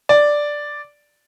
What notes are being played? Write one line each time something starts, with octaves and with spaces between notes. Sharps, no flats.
D5